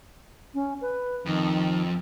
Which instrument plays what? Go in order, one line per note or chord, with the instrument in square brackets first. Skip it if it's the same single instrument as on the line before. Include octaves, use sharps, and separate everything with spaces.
[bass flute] C#4
B4
[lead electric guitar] F2 [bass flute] D#3